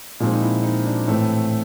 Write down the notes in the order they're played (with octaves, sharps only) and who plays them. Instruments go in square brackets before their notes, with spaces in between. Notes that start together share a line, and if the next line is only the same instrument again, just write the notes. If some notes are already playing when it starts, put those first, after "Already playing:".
[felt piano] A#2 F3 G#3 C4 D#4
D#4
E4
D#4
D4
A2 E3 A3 C4